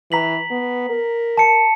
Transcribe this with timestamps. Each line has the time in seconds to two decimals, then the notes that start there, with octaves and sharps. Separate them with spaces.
0.12 E3 A#5 B6 F#7
0.51 B3
0.90 A#4
1.38 A5 C#7